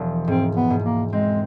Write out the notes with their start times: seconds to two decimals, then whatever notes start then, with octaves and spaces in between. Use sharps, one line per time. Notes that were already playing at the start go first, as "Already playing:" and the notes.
Already playing: E1 F3
0.27 G#2 C4
0.56 B3
0.70 G#2
0.84 A#3
1.13 G#3 C4